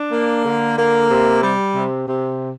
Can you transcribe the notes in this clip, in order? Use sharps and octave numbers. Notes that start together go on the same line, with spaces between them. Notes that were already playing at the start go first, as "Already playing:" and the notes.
Already playing: D4
A#3
D3
A#3
C3
G3
C3
C3